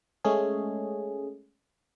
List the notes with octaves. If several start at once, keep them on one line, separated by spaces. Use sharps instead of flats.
G#3 A3 C#4 G#4